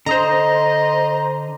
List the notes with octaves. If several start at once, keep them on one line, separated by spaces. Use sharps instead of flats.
D3 C5 D#5 A#5 D#6